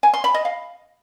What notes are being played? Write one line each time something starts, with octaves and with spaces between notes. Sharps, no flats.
G#5
C6
B5
D#5
F5